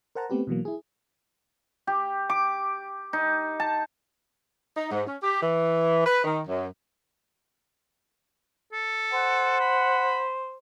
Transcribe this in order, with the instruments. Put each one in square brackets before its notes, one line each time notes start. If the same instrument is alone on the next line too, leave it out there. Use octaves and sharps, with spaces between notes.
[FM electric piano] A#4 C5 F#5 A5 A#5
A3 B3 C4 G4 B4
B2 E3 F#3 A#3
E4 G#4
[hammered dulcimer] G4
D6
D#4
A5
[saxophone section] D#4
G#2
C#4
G4
E3
B4
D#3
F#2
[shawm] A4
[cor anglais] C5 [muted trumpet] F#5
[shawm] B5